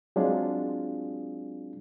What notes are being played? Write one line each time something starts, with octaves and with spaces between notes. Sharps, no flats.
F#3 G#3 C4 D4 F4 G#4